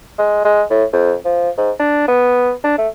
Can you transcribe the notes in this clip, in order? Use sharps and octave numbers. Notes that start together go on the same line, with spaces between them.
G#3
G#3
A2
F2
F3
G#2
D4
B3
D4
A3